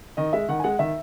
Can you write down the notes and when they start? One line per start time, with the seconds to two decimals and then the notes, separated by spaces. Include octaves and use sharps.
0.17 D#3 D#5
0.33 G#3 E5
0.48 D#3 F#5
0.60 G#5
0.64 G#3 F#5
0.79 D#3 E5